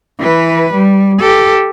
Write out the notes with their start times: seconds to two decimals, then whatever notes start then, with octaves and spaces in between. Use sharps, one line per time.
0.19 E3 B4
0.74 G3
1.19 G4 A4